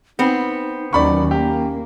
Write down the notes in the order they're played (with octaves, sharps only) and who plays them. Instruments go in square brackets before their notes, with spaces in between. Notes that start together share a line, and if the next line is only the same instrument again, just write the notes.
[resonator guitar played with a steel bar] B3 C4 [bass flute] D#4
[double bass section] D#2 D#3 F#3 [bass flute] C#4 [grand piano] D5 B5 C#6
[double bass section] A#3 [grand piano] G4